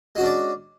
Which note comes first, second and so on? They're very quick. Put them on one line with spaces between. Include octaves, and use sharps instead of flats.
G#3 F#4 C#4 D4 D5